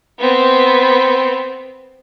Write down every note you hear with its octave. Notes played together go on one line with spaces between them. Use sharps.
B3 C4